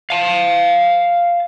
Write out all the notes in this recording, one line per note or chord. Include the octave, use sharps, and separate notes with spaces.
F5 A5